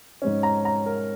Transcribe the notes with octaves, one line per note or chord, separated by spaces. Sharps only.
G#2 G#3 C#4
A#5
A#5
A#4